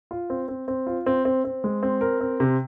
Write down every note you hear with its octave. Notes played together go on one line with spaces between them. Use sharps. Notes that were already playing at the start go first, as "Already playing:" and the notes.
F4
C4
C4
C4
F4
C4
C4
C4
G#3
C4
A#4
C4
C3